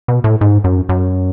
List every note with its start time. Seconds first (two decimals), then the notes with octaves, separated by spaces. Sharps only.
0.08 B2
0.24 A2
0.41 G#2
0.64 F#2
0.89 F#2